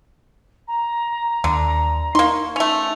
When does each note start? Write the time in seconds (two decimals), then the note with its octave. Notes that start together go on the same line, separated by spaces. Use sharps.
0.67 A#5
1.44 D#2 D3
2.15 A#3 D#4 C6 C#6
2.56 A3 C#4 F7